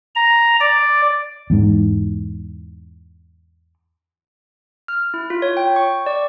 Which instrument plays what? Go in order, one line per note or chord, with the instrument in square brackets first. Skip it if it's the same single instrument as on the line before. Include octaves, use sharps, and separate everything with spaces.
[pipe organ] A#5
D5
[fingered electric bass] E2 G#2
[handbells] F6
E4
F4
C#5
G5
C#6
D5